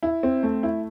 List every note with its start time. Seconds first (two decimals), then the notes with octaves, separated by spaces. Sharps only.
0.03 E4
0.23 C4
0.43 A3
0.63 E4